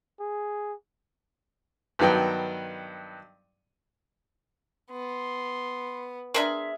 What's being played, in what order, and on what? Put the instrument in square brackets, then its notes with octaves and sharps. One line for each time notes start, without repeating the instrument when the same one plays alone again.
[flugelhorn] G#4
[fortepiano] G2 D#3 F#3 B3 G5
[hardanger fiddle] B3 [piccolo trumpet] C6
[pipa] D4 A#4 C5 [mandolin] G#4 E5 F6